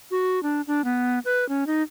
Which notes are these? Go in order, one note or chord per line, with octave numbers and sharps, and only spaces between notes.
F#4
D4
D4
B3
B4
C#4
D#4